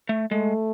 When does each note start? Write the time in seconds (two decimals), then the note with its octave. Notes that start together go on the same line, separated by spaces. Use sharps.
0.09 A3
0.31 G#3 A3